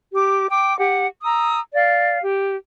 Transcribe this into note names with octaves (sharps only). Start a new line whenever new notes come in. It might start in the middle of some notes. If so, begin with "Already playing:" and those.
G4 D6
G5 D6
G4 F#5
A#5 D#6 E6
D5 F5
G4